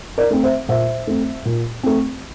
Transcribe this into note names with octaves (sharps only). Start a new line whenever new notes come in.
A#4 D5
A3 C4
C5 E5
A#2 C5 E5
A3 C4
A#2
A3 C4